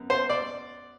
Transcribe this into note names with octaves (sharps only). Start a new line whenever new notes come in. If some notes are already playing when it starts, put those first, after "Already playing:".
Already playing: F#2 B3
C5
D5